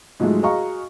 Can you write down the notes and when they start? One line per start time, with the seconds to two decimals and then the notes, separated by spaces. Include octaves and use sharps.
0.20 G#2 F3 F#3 G#3 A3
0.42 F#4 G#4 D#5 F5 A#5 C#6